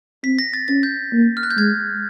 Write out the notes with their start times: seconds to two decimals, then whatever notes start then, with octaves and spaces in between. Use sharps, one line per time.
0.24 C4 B6
0.39 A#6
0.53 A6
0.68 C#4 A6
0.83 G6
1.13 A#3
1.37 F6
1.43 F#6
1.51 G6
1.57 G#3 G#6